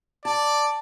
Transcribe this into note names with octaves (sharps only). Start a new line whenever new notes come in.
D5 A5